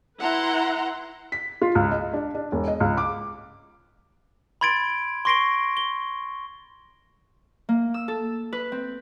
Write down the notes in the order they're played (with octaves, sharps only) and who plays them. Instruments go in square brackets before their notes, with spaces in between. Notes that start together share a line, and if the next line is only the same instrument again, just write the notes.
[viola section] E4 B4 F#5 A#5 C6
[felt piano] B6
F4
C#2
D#5
D4
D4
E1
D#5
C#2
D6
[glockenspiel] B5 C6 G#6 A6 D7
C6 C#6 A#6 C7 D7 G7
G7
[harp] A#3
E6
A4
B4
C4